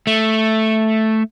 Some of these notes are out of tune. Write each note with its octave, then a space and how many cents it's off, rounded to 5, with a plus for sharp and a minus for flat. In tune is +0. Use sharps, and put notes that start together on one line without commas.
A3 +0